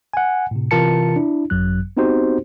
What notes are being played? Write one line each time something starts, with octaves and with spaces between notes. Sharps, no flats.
F#5 G#5
A2 C3
C3 E3 F4 A#4 A5 C#7
D4 E4
G#1 F#2 F#3 F#6
B3 C4 D#4 F#4 G4 C5